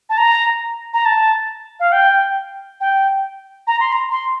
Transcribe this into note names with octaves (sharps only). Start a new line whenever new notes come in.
A5
A#5
A#5
A5
F5
G5
G5
A#5
C6
A#5
C6